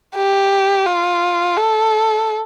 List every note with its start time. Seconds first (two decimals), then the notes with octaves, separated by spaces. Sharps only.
0.16 G4
0.87 F4
1.57 A4